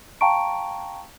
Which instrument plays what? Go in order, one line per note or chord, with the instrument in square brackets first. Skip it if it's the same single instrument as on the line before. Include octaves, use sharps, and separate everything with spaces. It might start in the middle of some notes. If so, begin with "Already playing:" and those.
[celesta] F5 G5 A5 A#5 C#6 D7